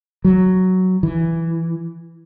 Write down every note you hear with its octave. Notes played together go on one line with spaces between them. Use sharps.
F#3
E3